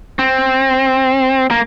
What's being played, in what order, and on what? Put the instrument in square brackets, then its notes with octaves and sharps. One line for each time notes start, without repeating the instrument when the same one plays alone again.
[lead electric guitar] C4
A#3